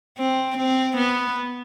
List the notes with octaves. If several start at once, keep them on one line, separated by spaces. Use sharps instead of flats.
C4
C4
B3